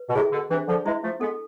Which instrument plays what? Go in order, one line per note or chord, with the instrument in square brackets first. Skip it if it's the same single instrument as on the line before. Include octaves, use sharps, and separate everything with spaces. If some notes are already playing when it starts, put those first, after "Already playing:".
Already playing: [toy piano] B4
[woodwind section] B2
[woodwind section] A2 C3 [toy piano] G#4
[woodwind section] B2 D3
[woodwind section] C3 E3 [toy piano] D4
[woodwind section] D3 F3
[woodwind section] E3 G#3 [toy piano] E4
[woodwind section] F3 A3
[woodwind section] G#3 B3 [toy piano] A4